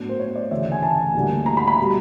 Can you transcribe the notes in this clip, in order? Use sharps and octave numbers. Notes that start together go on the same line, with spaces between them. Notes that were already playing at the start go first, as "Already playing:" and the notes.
Already playing: A2 F#3 B3 D4
C5
C#5
D5
D2 C#3 E3 A3 E5
G#5
A5
D2 D3 G3 A#3 D4
A#5
B5
B5
B2 G3